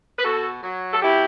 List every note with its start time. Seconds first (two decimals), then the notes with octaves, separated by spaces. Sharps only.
0.19 B4
0.24 B2 F#4 A4
0.63 F#3
0.93 A4
1.02 B2 E4 G4